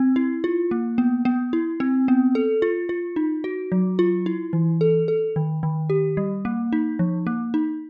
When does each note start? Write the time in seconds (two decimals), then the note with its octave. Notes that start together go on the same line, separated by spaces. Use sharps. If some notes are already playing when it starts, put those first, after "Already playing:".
Already playing: C4
0.16 E4
0.44 F4
0.71 A#3
0.98 B3
1.25 B3
1.53 E4
1.80 C4
2.08 B3
2.35 A4
2.62 F4
2.89 F4
3.16 D#4
3.44 F#4
3.72 F#3
3.99 F4
4.26 E4
4.53 E3
4.81 A4
5.08 A4
5.36 D#3
5.63 D#3
5.90 G4
6.17 G3
6.45 A#3
6.73 D#4
6.99 F3
7.27 A#3
7.54 D#4